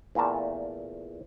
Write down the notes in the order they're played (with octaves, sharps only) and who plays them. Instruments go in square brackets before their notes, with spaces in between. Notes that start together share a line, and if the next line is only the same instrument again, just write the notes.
[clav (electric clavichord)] E2 A#2 A3 A#4 A5